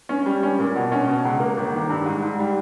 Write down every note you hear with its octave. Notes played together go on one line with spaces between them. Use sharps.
C#4
G3
C#4
A#2
B2
C#4
B2
C#2
A#3
G1
D#3
G2
G#2
G#2
G3